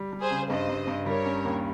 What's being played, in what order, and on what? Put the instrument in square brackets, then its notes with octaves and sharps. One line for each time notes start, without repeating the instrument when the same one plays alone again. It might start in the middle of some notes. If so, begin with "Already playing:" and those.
Already playing: [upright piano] G3
G3
[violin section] G#4 C5
[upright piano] C#3
[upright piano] G2 [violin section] C5 D#5
[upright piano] G2
G2
[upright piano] G3 [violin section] A#4 C#5
[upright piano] C#4
D#2